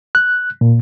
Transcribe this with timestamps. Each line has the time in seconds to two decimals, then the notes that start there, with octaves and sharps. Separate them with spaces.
0.15 F#6
0.61 A#2